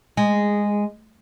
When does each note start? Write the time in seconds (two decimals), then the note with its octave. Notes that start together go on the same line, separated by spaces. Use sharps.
0.17 G#3